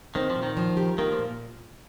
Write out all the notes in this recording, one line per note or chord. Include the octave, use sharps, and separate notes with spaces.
D#3 C4
F3
A#2
D#3
F3
G4
D#3 A#3
F3
A#2